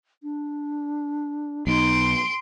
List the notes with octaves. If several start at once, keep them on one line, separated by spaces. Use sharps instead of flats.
D4
B1 D#4 C6 D7